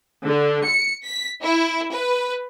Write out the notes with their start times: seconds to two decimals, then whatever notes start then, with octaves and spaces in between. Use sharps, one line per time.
0.25 D3
0.66 C#7
1.06 B6
1.43 E4
1.94 B4